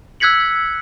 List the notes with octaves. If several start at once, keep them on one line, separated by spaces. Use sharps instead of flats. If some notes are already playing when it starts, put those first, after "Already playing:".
E6 F#6 G#6 B6 C#7 F#7